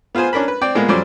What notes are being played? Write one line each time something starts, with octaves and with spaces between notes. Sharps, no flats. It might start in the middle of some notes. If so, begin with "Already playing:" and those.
B3 F4 G#4 C5 G#5
C#4 D4 A#4 B5
B4
C4 D5 G5
A#2 G#3 A#3 B3 A#4
F2 F#3 G3 C#4 C5 D5